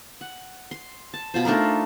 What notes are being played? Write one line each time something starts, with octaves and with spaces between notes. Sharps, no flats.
F#5
C6
A5
B2 F4 C5
A3 D4 D#4 A#4